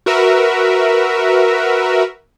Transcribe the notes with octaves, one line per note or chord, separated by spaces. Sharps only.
F#4 A#4 B4 E5